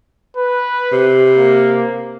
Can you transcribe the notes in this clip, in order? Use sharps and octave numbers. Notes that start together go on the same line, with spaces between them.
B4
C3
A#3